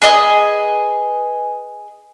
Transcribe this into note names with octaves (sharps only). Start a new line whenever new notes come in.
G#4 B4 D#5 G#5